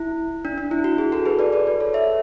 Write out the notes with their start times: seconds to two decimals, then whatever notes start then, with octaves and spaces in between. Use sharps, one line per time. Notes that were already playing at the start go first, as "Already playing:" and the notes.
Already playing: E4
0.45 D4
0.58 D4
0.71 E4
0.84 F#4
0.98 G#4
1.12 F#4 A4
1.26 G#4 B4
1.39 B4 D5
1.53 B4 D5
1.67 B4 D5
1.80 A4 C#5
1.94 C#5 E5